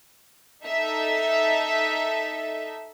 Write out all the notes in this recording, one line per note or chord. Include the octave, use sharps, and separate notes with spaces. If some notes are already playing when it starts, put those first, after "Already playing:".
D#4 A4 E5